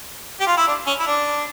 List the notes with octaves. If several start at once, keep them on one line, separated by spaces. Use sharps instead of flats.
G4
F4
E4
D4
C#4
E4
D4